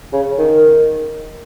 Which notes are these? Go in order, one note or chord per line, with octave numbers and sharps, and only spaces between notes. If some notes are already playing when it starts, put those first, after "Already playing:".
C#3
D#3